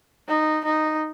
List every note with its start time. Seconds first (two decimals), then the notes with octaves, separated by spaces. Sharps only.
0.28 D#4
0.65 D#4